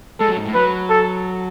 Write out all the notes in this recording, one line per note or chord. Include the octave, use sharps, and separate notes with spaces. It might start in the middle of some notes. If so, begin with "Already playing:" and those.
G#3 A4
F#3
G#2
A2
F#3 B4
A4